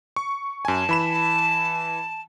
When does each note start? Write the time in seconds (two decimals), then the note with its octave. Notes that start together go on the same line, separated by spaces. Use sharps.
0.16 C#6
0.65 F#2 G#5 A5
0.89 E3 B5 E7